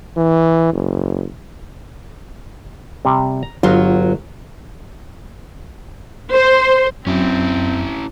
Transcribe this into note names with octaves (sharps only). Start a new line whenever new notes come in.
E3
F#1
C3 G3
A#5
G1 F#3 F4 F#4
C5
F#2 C4 C#4 E4